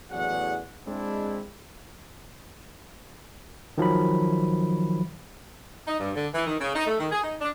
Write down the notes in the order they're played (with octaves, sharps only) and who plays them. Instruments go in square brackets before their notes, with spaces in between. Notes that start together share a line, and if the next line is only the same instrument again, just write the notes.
[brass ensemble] A1 E2 F#3 G#4 D5 F#5
G#3 C4 D4 E4
[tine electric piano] D#3 F3 F#3 B5
[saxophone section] D#4
G2
D3
E3
D#3
C#3
D#4
A3
D#3
G#4
D#4
D4